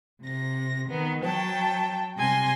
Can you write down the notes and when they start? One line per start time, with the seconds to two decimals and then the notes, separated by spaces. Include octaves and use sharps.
0.21 C3 A#6
0.89 D#3 B3
1.24 F#3 G5 A5
2.17 C3 G3 G#5 C6 A#6